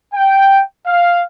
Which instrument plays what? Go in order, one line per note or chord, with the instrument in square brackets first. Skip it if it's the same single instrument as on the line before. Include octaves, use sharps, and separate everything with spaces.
[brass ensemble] G5
F5